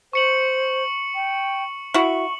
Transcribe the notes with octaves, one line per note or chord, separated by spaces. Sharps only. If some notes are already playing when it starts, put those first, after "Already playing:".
C5 C#6 C#7 F#7
G5
E4 F#4 C#6 F#7